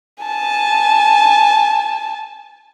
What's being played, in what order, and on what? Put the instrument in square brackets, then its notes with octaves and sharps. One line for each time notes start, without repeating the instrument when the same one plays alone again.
[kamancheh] G#5 A5